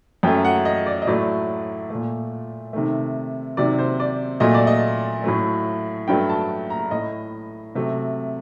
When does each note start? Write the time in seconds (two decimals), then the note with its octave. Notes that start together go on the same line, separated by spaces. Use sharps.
0.23 F#2 F#3 A3 G5
0.45 F#5
0.65 D#5
0.86 D5
1.02 D#5
1.07 A2 F#3 A3 D5
1.90 A#2 A3
2.73 C3 D#3 A3
3.57 C3 D#3 F#3 D5
3.79 C5
4.00 D5
4.40 A#2 F#3 A3 D#5
4.54 D5
4.67 D#5
5.24 A2 F#3 A3
6.08 G2 F#3 A3 G5
6.29 A5
6.70 A#5
6.91 A2 A3 D#5
7.75 C3 F#3 A3